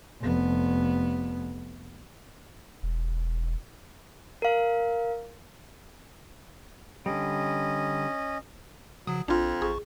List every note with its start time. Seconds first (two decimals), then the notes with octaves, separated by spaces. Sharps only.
0.22 F1 B3
2.83 E1
4.42 A#4 F5
7.06 D3 G3 C#4 D#5
9.07 C#3 F3 F#3 D#6
9.28 A#1 F2 D4 F4
9.62 A1 G#4 C#6